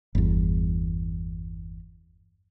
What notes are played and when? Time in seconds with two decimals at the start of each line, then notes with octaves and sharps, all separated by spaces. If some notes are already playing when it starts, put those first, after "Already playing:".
0.15 G1 E2